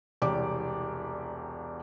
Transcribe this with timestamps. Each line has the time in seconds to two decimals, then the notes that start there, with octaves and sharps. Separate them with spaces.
0.22 E1 C2 G4 D5 D6